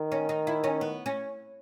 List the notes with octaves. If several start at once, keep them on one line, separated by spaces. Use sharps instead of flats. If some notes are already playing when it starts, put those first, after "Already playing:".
Already playing: D#3
C#4
D#4
E4
C#4
B3
C#4